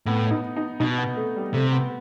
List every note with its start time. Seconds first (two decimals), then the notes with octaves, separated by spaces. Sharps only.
0.06 A2 B3
0.31 D#4
0.56 D#4
0.80 B2 D#4
0.98 B3
1.17 A3
1.36 G3
1.53 C3 A3
1.73 B3